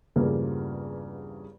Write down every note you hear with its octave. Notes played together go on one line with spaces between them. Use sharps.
E2 G2 C#3 F3 A#3